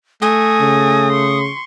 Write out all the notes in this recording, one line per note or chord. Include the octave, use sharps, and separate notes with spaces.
A3 G#5 D#6 A#6
C#3
C6 C#6